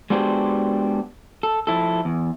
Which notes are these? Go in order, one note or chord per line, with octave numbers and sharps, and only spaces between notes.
G#3 B3 D4 F#4 G4 C5
A4
F3 E4 A4
E2